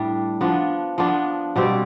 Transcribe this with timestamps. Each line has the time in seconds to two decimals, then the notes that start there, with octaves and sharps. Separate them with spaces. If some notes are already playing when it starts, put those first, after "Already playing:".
Already playing: A2 G3 D4
0.41 F3 B3 D4
0.98 F3 B3 D4
1.56 B2 G3 C4 G4